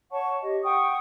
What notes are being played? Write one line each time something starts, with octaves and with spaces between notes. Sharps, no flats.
C#5 F#5 A5 C#6
G4 D#5
F#5 G5 C#6 D#6